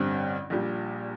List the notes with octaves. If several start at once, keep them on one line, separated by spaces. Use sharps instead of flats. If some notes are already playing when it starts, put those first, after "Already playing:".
Already playing: A1 G2 D3 G3 C4
A#1 A#2 G3